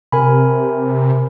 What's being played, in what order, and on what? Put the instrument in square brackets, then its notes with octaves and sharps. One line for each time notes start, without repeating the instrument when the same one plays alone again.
[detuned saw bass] C3 [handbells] A#4 G#5 B5